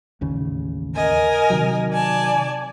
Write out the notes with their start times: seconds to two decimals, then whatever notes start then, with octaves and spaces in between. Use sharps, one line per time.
0.21 A1 D#2 C#3
0.94 A#4 D#5 G#5
1.50 C3 D#3 F#3
1.92 D5 G#5 A5